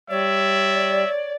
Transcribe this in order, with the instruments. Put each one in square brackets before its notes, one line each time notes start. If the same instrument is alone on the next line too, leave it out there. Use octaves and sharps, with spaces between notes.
[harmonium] G3 [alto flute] C#5 [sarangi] D5 [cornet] E5